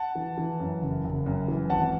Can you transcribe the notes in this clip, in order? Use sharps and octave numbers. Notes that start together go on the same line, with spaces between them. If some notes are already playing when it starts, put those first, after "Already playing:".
Already playing: F#5 A5
E3
E3
F#2
F#1
F#1
F#2
E3
G#1 F#5 A5